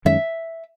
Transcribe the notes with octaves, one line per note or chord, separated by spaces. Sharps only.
F#2 D#3 G#3 C#4 E5